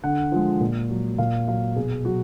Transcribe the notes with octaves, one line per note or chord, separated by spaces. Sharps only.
D3 F#5
F3 G#3
A#2
F#3
A#2 F5
F#3 F5
B2 G#4
F#3 F#4